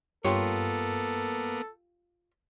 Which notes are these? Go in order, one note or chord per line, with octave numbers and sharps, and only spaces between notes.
G2 A#3 B3 F4 G4 A4 C#5